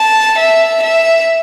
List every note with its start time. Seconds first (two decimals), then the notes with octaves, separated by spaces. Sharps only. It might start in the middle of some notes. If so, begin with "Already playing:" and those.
Already playing: A5
0.39 E5
0.83 E5